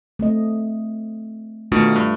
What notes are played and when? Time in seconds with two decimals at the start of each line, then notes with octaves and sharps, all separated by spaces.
0.19 A3 C4 D#5
1.72 B2 D#3 A3 D4 F4
1.96 G2